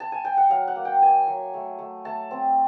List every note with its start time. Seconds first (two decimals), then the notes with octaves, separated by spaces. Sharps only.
0.00 A5
0.12 G#5
0.25 G5
0.37 F#5
0.49 F#3 F5
0.67 F#5
0.76 A#3
0.85 G5
1.02 A#3 G#5
1.27 F#3
1.54 A3
1.79 A3
2.05 A3 A5
2.31 C4